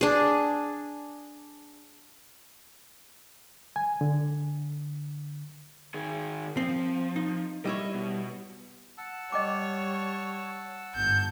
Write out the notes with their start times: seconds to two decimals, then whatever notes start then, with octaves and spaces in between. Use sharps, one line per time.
0.01 D4 G#4
3.76 G#5
4.01 D3
5.94 D#3 G#4
6.57 F3 C4
7.16 D#4
7.65 G3 E4 C#5 D#5
7.94 B2
8.98 F#5 A5 E6
9.32 G3 C#5 D#5 G5 D6
10.95 G1 G#2 G6